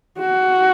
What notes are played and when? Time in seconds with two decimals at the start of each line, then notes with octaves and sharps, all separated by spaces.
0.19 F#4